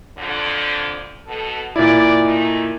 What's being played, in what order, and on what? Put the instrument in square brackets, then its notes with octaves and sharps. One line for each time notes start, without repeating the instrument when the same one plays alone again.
[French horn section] F2 D3
B2 A4
[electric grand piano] A#2 E4 [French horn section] D5
[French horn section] A3 D#4